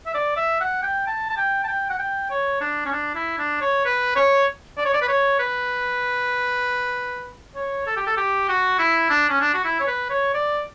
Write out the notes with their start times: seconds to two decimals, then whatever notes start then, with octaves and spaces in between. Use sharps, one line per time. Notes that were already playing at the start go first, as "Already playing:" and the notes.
0.06 E5
0.14 D5
0.36 E5
0.60 F#5
0.83 G5
1.07 A5
1.30 A5
1.37 G5
1.64 A5
1.68 G5
1.90 F#5
1.99 G5
2.30 C#5
2.61 D4
2.85 C#4
2.92 D4
3.15 E4
3.38 D4
3.61 C#5
3.85 B4
4.16 C#5
4.77 D5
4.86 C#5
4.94 D5
5.02 B4
5.08 C#5
5.40 B4
7.55 C#5
7.87 A4
7.97 G4
8.07 A4
8.17 G4
8.49 F#4
8.79 E4
9.10 D4
9.29 C#4
9.41 D4
9.54 F#4
9.65 E4
9.80 C#5
9.87 B4
10.10 C#5
10.34 D5